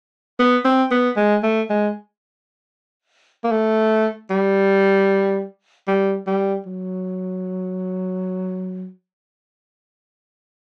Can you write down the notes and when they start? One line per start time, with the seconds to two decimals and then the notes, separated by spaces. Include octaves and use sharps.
0.39 B3
0.65 C4
0.91 B3
1.17 G#3
1.43 A3
1.70 G#3
3.44 A#3
3.52 A3
4.30 G3
5.87 G3
6.27 G3
6.66 F#3